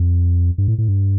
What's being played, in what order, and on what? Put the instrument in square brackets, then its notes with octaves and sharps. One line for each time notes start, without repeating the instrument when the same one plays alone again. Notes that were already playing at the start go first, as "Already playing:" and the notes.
Already playing: [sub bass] F2
G2
A2
A2
G2